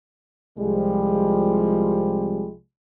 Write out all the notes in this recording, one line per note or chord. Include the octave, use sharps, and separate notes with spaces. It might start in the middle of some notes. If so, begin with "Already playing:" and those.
C2 F3 G3 G#3